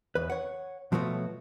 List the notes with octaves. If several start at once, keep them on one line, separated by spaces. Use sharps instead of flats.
E2 B4
C#5 F#5
B2 F3 F#3 A3 B3 F#4